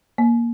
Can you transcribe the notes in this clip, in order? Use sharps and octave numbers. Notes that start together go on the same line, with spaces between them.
A#3